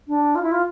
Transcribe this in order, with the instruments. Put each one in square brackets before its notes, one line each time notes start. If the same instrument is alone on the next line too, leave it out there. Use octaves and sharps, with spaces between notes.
[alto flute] D4
F4
E4
F4